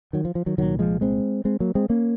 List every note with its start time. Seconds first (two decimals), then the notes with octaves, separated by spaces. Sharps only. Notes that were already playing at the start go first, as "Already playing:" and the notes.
0.13 D#3 F#3
0.25 F3
0.35 F3
0.46 D#3 F#3
0.57 C2 A#2 D#3 F#3
0.79 F3 G#3
1.01 G#3 C4
1.45 G#3 C4
1.60 F#3 A#3
1.75 G#3 C4
1.89 A#3 C#4